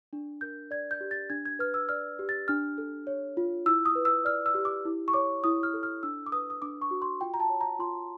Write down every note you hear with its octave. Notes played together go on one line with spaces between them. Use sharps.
D4
A#4 G6
D5 G#6
G6
G4
A6
D4 G#6
G#6
B4 F6
E6
D5 F6
G4
A6
D4 F6
A4
C#5
F4
E4 E6
D#6
B4
E6
D5 F6
E6
G4
D6
E4
C#6
C#5 D6
E4 D#6
F6
A4
F6
D4 E6
D6
B4 D#6
D#6
D4 D6
C#6
F#4
C6
F4 G5
A#5
A5
C#5
A#5
F4 C6